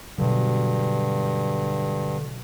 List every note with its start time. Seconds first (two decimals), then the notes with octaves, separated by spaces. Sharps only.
0.18 G2 B2 D3 F#3